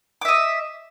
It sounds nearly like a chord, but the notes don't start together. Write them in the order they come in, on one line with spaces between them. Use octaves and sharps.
D6 E5 D#5